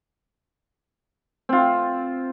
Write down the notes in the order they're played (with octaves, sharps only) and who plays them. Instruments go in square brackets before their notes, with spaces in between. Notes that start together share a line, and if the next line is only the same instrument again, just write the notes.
[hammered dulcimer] C4 F4